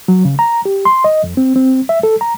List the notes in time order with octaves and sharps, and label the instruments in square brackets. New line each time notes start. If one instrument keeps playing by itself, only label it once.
[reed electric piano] F#3
C#3
A#5
G4
C6
D#5
F2
C4
C4
E5
A4
A#5